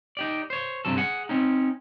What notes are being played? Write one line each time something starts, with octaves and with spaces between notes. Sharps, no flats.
D#4 G4 D5
C5 C#5
G2 C3 F#3 A4
G#4 F#5
C4 C#4 D#4